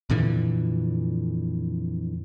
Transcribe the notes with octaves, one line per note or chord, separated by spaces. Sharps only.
F2 A#2 D3 E3